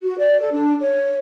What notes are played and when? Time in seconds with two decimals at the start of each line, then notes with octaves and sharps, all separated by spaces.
0.02 F#4
0.18 D5
0.40 A4
0.53 D4
0.81 C#5